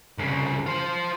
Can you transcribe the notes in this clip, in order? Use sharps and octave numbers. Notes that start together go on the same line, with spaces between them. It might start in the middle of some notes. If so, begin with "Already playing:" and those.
C2 C#3
F4 C5